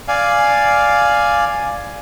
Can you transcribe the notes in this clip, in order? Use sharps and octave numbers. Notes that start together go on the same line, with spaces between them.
D5 F5 G#5